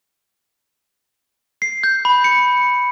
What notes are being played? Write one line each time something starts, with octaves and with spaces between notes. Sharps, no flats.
C7
G6
B5
C#7